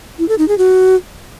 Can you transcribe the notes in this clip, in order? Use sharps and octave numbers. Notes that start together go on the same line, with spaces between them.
E4
A4
D#4
G#4
F#4